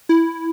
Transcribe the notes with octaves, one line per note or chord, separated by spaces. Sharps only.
E4